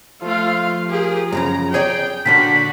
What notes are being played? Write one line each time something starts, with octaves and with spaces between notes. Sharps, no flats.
F3 A3 F4 F5
G4 G#4 A#4
F#2 A2 C#3 A#5
G#4 C#5 D5 G5
A#2 D3 A#3 D4 F#4 G5 B6